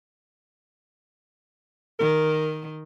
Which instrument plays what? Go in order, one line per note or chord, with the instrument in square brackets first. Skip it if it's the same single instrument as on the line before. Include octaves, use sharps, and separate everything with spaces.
[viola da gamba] D#3 [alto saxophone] A#4